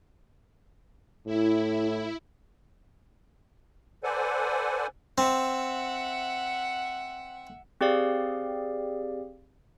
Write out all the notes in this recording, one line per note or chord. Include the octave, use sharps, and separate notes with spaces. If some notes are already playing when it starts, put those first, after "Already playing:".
A2 E4
A4 B4 C5 D5 F#5 G#5
C4 E5 F#5
C4 G4 G#4 D5 F5